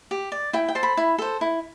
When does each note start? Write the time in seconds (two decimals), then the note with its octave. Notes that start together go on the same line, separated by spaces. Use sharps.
0.11 G4
0.32 D5
0.53 E4 G5
0.68 G5
0.75 A4 C5
0.83 B5
0.97 E4
1.18 A4 C5
1.41 E4